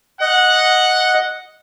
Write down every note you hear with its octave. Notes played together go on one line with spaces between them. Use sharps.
D#5 F#5